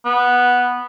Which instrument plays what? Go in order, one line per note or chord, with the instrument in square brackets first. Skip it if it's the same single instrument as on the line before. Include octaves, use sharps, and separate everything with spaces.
[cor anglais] B3